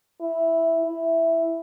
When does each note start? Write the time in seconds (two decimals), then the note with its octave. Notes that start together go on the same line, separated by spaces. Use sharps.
0.21 E4
0.85 E4